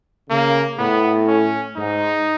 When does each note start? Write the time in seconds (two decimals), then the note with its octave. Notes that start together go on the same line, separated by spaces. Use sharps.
0.30 C#3 A#3
0.78 A2 B3
1.27 C#4
1.77 G#2 D#4